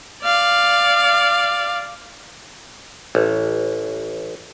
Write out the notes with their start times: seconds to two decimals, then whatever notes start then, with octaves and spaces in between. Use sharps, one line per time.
0.23 D5 F5
3.15 A1